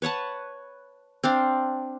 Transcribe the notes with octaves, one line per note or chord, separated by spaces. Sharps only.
B4 C#5 F#5 A5
C4 D4 F5